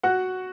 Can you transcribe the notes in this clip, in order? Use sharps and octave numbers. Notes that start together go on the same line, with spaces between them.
F#4 F#5